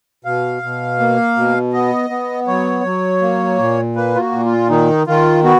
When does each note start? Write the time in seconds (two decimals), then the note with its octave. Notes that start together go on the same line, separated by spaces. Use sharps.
0.25 B2 F5
0.62 B2
0.99 A#3
1.36 B2
1.73 B3 D#5
2.10 B3
2.47 F#3 C#5
2.84 F#3
3.21 A#3
3.58 A#2
3.96 A#3 B4
4.15 F4
4.20 F#4
4.32 A#2
4.45 F4
4.69 D#3 D#4
5.07 D#3 F4
5.44 B3 F#4